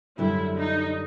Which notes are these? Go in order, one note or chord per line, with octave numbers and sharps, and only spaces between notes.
F#2 D3 G3 E4
D#4